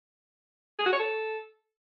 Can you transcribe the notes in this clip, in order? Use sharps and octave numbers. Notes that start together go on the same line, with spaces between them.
G#4
F#4
C#5
A4